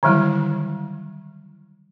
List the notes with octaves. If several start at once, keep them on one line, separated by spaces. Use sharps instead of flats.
D3 D#3 F#3 G3 E4